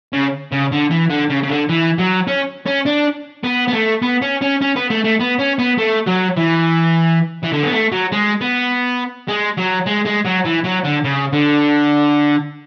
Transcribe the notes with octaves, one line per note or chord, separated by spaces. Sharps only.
C#3
C#3
D3
E3
D3
C#3
C#3
D3
E3
F#3
C#4
C#4
D4
B3
B3
A3
B3
C#4
C#4
C#4
B3
A3
A3
B3
C#4
B3
A3
F#3
E3
E3
D3
B3
A3
F#3
G#3
B3
G#3
F#3
G#3
G#3
F#3
E3
F#3
D3
C#3
D3